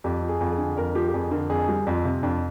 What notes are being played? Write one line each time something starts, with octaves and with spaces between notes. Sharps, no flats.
F2 G4
F3
G#4
F2
G#4
D3
F2 A#4
F3 G4
G4
F2 G#4
D3 A#4
F2 G#4
G3
F2 F4
C3
F2 D4